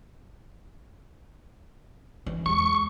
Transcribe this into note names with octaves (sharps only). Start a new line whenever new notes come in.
E3
E2 G#3 C#6